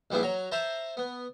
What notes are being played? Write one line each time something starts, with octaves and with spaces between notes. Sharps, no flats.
A#1 G3 B3 E4 G#4
F#3 C#5 A#5
C5 E5 A5 A#5
B3